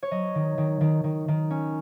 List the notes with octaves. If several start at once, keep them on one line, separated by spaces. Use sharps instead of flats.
C#5
F#3 D#5
D#3
D#3
D#3
D#3
D#3
C#4